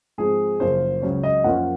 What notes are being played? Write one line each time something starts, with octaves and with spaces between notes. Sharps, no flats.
G#2 F3 C4 G#4
F#1 F#2 F3 A#3 C5
C#2 C#3 F#3 C#4 C#5
D#5
F#2 F3 A#3 C#4 F4 F#5